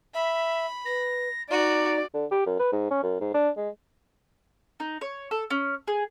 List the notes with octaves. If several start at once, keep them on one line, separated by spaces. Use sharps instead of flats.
E5 B5
B4 A#6
D#4 F#4 D5 A#5
D3
G4
F#2
B4
G#2
C#4
F#2
G#2
D4
G#3
D#4
C#5
A4
C#4
G#4